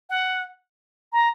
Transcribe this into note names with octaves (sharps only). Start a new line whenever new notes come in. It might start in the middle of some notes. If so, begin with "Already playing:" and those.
F#5
A#5